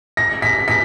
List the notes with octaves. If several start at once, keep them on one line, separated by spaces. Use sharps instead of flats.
A#6
B6
B6